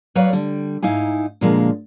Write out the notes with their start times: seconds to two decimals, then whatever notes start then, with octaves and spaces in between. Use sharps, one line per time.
0.15 F#3 B4 C#5 D5 F5
0.33 D3 G3
0.83 G#2 D#4 E4 F5 G#5
1.41 A#2 D3 F3 G#3 A#3